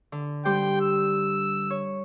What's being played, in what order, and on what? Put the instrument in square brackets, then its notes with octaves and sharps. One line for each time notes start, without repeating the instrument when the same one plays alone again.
[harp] D3
[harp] G3 G4 C5 [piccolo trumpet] G5
[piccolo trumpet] E6
[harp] C#5